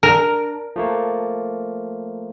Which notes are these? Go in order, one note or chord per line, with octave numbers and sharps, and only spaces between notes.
D4 A#4
F3 A3 A#3